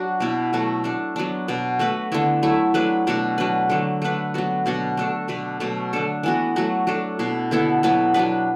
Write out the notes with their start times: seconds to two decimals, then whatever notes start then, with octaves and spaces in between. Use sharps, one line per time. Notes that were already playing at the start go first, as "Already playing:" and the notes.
Already playing: F#3 D4 F#4
0.20 B2 B3 E4
0.53 B2 F#3 A3 F#4
0.84 A3 D4 A4
1.16 F#3 B3 D4
1.48 B2 F#3 B3
1.79 A3 F#4 B4
2.12 D3 B3 E4
2.43 F#3 A3 E4
2.74 F#3 A3 D4 B4
3.07 B2 A3 D4 F#4
3.38 F#3 D4 B4
3.70 D3 F#3 A3
4.02 A3 D4 B4
4.34 F#3 B3 F#4
4.66 B2 B3 D4 F#4
4.97 A3 D4 A4
5.28 B2 A3 D4 B4
5.60 B2 F#3 A3
5.93 D3 A3 D4 A4
6.23 E3 B3 F#4
6.56 F#3 A3 F#4
6.87 F#3 D4 A4
7.19 B2 B3 E4
7.51 D3 B3 E4 A4
7.83 F#3 B3 E4 B4
8.14 F#3 B3 D4 B4